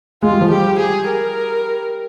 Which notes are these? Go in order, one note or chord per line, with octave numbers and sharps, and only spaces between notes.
G#3 F4
G3
F3
G3 G4
G#4
A#4